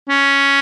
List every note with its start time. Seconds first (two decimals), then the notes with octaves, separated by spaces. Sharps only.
0.09 C#4